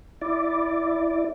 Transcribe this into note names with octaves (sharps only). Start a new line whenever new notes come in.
E4 D5